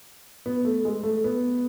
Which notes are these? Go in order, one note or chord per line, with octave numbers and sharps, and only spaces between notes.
B3
A3
G#3
A3
B3